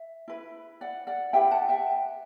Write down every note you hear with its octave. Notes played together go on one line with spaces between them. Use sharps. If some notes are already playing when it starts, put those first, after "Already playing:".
Already playing: E5
E4 B4
D5 F#5
D5 F#5
E4 G4 B4 E5 G5
F#5 A5
E5 G5